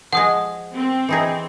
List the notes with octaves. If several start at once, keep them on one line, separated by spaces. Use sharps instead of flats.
F3 G#3 F#5 D#6
C4
E3 D#4 G#4